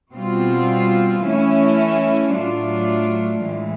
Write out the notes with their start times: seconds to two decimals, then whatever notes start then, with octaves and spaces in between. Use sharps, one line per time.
0.12 B2 G3 C4 F4
1.22 E3 A3 C#4 E4
2.33 A2 F#3 A3 D4 F4
3.43 A2 E3 G#3